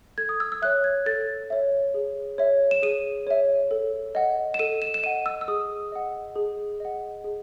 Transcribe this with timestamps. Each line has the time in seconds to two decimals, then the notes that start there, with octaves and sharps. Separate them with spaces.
0.18 A4 G#6
0.29 D#6
0.40 E6
0.52 E6
0.62 C#5 E5 F#6
0.84 G#6
1.06 A4 A6
1.50 C#5 E5
1.94 G#4
2.38 C#5 E5
2.71 E7
2.83 G#4 D#7
3.27 C#5 E5
3.71 A4
4.15 D#5 F#5
4.54 E7
4.59 A4 D#7
4.82 E7
4.94 E7
5.03 D#5 F#5 D#7
5.26 E6
5.41 E6
5.48 G#4 D#6
5.92 D#5 F#5
6.36 G#4
6.80 D#5 F#5
7.24 G#4